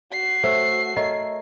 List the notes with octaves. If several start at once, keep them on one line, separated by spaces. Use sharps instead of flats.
F#4 C7
A3 C5 C#5 E5
A3 A#4 C#5 D#5